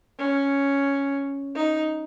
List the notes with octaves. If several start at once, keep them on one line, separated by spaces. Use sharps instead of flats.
C#4
D#4